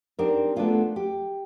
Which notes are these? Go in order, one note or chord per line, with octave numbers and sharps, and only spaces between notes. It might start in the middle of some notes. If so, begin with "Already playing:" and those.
C4 D4 D#4 G4 A#4
A3 B3 D4 D#4 F4 G#4
G4